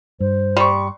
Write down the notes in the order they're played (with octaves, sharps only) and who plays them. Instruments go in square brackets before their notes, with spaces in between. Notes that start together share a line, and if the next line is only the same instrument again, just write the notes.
[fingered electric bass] G2 [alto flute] C5
[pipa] G3 [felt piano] C6 C#6